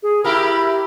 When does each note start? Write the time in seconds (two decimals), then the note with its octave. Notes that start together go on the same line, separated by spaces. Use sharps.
0.03 G#4
0.24 E4 G4 A#4 B5